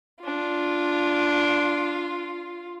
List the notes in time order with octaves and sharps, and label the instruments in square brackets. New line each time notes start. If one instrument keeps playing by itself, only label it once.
[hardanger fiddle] D4 [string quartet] F4